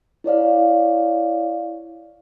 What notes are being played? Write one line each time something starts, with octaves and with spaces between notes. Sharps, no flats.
E4 C#5 D5 F5